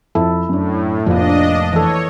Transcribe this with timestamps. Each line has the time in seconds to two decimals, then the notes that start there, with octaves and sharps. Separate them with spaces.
0.15 F2 E4 A4
0.49 F#2 A2 D4
1.07 F1 F3 A#3 D4 D#5
1.73 E3 A4 C#5